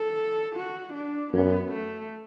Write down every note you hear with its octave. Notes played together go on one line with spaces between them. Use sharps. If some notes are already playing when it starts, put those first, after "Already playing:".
Already playing: A4
F#4
D4
F#2 B3
A3